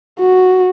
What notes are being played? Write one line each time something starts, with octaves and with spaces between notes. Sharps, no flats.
F#4